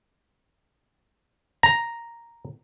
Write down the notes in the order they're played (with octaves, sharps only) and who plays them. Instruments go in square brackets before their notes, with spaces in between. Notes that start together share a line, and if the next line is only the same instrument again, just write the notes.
[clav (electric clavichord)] A#5